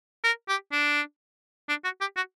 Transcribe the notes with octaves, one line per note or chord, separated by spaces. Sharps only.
A#4
G4
D4
D4
F#4
G4
F#4